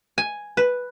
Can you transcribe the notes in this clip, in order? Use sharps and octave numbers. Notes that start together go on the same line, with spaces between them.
G#5
B4